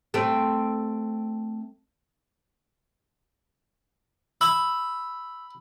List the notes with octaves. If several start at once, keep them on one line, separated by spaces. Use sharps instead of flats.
A3 C4
B5 E6